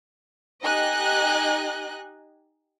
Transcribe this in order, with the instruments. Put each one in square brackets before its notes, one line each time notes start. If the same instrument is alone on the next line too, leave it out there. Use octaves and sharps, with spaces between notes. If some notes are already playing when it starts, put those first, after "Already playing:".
[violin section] D#4 G4 D#5 G#5 F#6